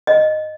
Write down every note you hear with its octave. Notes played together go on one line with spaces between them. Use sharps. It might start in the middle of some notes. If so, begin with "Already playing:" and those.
D#5